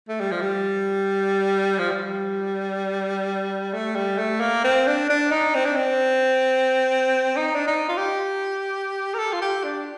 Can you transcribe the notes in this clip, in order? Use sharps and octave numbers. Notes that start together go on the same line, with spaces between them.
A3
G3
F3
G3
F3
G3
A3
G3
A3
A#3
C4
D4
D4
D#4
C4
D4
C4
D#4
D4
D#4
F4
G4
A#4
A4
F4
G4
D4